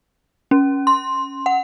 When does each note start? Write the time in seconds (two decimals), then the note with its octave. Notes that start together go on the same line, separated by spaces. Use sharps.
0.51 C#4
0.87 C6
1.46 F#5